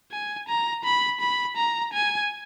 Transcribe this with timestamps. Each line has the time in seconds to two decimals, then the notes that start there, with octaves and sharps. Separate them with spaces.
0.11 G#5
0.48 A#5
0.84 B5
1.20 B5
1.57 A#5
1.94 G#5